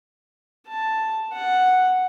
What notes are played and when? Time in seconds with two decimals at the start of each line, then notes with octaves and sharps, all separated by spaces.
0.68 A5
1.33 F#5